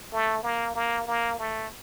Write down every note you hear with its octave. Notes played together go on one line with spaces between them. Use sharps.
A3
A#3
A#3
A#3
A3